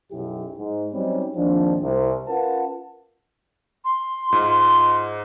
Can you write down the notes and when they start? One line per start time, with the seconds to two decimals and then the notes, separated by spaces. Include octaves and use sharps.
0.11 B1 F#2 E4 G4
0.58 G#2
0.93 F#3 G3 C4 C#4 D#4
1.35 D#2 G#2 F3 C4 D4
1.82 C2
2.28 C#4 F4 A#4 B4 F#5 A5
3.84 C6
4.32 G#2 F4